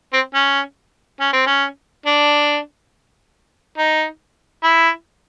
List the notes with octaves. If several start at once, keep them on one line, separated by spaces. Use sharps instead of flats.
C4
C#4
C#4
C4
C#4
D4
D#4
E4